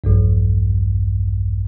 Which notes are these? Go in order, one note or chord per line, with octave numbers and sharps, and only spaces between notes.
A#1 E2 G2